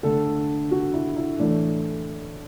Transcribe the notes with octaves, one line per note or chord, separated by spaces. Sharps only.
D3 A3 A4
F#4
E4
E4
A2 E3 A3 D4